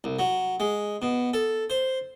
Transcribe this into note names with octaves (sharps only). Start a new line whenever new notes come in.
C2
F#3
G#3
B2
A4
C5